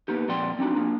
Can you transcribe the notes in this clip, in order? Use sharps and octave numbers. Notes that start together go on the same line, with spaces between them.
A#3 B3 D#4 G4
F2 A#2 D5 F#5 G5 C6
C4 D4 D#4 F#4
A#3 D4 F4